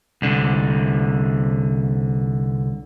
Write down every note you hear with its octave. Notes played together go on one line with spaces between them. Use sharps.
C2 D3